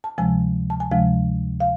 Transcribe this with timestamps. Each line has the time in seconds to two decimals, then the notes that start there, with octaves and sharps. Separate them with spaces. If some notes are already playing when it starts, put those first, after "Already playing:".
0.04 A5
0.18 D2 C3 F3 G#3 G#5
0.70 A5
0.80 G#5
0.91 D2 C3 F3 G#3 F5
1.60 F5